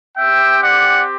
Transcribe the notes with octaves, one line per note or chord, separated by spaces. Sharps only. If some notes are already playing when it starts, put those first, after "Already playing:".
C4 G4 E5 G5
D5 F#5